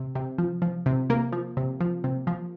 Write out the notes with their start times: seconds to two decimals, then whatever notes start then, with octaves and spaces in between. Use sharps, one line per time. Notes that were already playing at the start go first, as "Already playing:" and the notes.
Already playing: C3
0.15 C3
0.38 F3
0.62 F3
0.86 C3
1.10 C3 A#3
1.32 F3
1.57 C3
1.81 F3
2.04 C3
2.27 F3